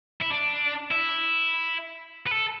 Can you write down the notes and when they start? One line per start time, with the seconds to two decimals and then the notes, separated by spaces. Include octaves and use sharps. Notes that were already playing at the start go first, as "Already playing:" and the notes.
0.22 E4
0.31 D4
0.91 E4
2.27 B4
2.31 A4